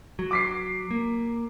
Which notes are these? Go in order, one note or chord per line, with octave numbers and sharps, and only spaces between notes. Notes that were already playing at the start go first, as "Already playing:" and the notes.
F#3
D6 B6 C7
A#3